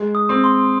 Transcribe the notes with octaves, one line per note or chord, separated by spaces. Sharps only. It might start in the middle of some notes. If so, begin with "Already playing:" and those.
Already playing: G#3
D#6
C4
C6